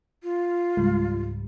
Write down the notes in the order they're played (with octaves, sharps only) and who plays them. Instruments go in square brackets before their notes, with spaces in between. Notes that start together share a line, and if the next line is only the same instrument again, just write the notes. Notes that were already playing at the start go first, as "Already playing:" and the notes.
[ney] F4
[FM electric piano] C#2 G#2 G3